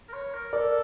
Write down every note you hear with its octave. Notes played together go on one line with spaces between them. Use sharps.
A#4
C#5
A#4
A4 A#4 D5